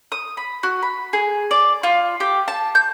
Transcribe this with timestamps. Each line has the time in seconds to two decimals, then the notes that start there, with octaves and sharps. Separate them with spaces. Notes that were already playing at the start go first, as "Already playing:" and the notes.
0.12 D#6
0.37 B5
0.63 F#4
0.82 B5
1.13 G#4
1.51 D5
1.83 F4
2.20 G4
2.48 A5
2.75 G6